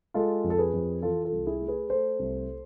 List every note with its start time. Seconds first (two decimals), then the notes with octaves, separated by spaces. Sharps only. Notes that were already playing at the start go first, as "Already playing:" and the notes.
0.14 G#3 F4 A4
0.44 F2
0.50 A4
0.58 G#4 B4
0.73 F2
1.02 E3 F4 A4
1.24 F4 A4
1.32 C2
1.47 E4 G#4
1.61 A3
1.68 G#4 B4
1.90 A3 A4 C5
2.19 C2